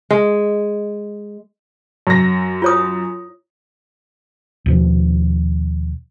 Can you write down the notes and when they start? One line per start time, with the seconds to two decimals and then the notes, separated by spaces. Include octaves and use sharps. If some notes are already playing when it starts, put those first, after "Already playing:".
0.11 G#3
2.07 F#2 A#6
2.62 F4 C#5 D#6
4.66 D#2 B2 F3